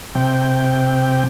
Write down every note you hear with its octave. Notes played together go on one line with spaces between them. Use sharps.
C3 G5